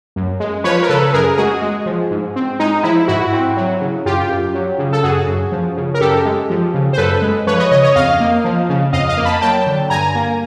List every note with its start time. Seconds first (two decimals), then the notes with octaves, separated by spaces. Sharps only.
0.16 F#2
0.40 G#3
0.64 F3 B4 C#5
0.82 A#4
0.89 C#3 A4 B4
1.13 F#2 G#4 A#4
1.37 G#3 F#4 G#4
1.62 G#3
1.86 F3
2.11 G#2
2.36 C4
2.60 G#3 D#4
2.83 F3 E4
3.08 G#2 E4 F#4
3.33 C4
3.57 F#3
3.81 C#3
4.05 F#2 F4 G4
4.30 F#2
4.54 F#3
4.79 C#3
4.93 A4
5.03 F#2 F#4 G#4
5.28 F#2
5.52 F3
5.76 C#3
5.94 A#4
6.00 F#2 G4 A4
6.25 G#3
6.50 F3
6.74 C#3
6.93 C5
6.98 F#2 A4 B4
7.22 G#3
7.47 F3 B4 C#5
7.59 C#5 D#5
7.71 C#3 C#5 D#5
7.83 C#5 D#5
7.95 F2 D#5 F5
8.20 A#3
8.44 F3
8.69 C#3
8.93 F2 D#5 F5
9.09 D#5 F5
9.17 A#3
9.25 A5 B5
9.41 F#3 G5 A5
9.67 D3
9.90 G2 G#5 A#5
10.15 A#3